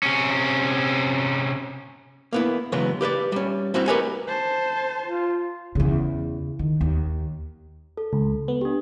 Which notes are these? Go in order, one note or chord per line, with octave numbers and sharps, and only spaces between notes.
C3 C#4
A#3 B3 E4
C#3 E3 F#3 G#3 B3
G4 B4 C5 D5
G3 C#4
G3 C4 E4 F#4
G4 A#4 B4 C#5 D#5 G#5
C5 A5
F4
E2 C#3
D#3
D#2
A4
C#2
B3
D4 G4